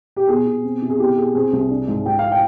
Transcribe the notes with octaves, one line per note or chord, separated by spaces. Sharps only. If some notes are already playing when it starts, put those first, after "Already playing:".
G4
B2 G#4
B2
C4
C3
G#4
B2 G4
B2 G#4
C4 G#4
C2
D4
G#2
G#2 G5
F5
G5